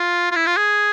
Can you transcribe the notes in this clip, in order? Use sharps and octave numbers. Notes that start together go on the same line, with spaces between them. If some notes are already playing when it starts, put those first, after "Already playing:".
Already playing: F4
F4
E4
F4
G#4